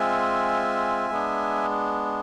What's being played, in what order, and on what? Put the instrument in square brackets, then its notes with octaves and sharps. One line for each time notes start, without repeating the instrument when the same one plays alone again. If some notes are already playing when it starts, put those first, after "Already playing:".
Already playing: [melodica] G#3 C4 F4 E5 G#5
G#3 B3 D4